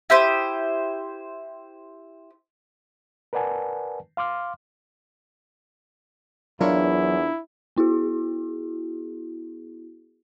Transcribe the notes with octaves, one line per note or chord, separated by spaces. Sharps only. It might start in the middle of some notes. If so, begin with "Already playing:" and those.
E4 G4 C5 D#6
A#4 B4 D5 F#5 G#5 A5
F5 C6 D6 F6
E2 F#3 D4 E4 F4 A#4 C#5
B3 E4 F#4 G#4